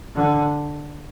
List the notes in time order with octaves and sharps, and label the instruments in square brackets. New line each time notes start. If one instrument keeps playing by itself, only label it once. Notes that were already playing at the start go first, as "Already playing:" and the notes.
[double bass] D3